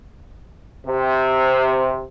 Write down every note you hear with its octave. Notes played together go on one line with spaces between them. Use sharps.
C3